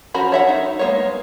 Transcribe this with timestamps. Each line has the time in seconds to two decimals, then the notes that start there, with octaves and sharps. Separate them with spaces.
0.14 F3 C#4 F#4 A#4 B5
0.32 C#5 E5 F#5
0.49 D#4
0.79 G#3 A#3 B3 C#5